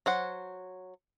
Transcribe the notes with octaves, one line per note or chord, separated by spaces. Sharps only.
F#3 C5 F#5